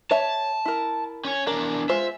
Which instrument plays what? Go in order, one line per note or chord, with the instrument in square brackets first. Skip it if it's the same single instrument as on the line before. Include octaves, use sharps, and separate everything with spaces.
[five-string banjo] C#5 E5 [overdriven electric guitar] A5
[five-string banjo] E4 A#4
[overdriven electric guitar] C#4 C#5
[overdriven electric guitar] E2 D4 [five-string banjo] A#4
[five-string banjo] G#3 F4 C5 [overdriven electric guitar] E5